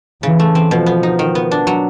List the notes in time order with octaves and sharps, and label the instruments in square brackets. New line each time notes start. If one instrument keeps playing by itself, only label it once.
[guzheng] C#3 [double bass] E3
[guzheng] A3
C4
[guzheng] B2 [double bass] F3
[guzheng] B3
D#4
D#3
B3
D4
F#3